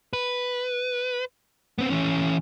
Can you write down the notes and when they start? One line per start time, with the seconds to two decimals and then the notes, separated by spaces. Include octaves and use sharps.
0.13 B4
1.78 B3 C4
1.90 E3 C#4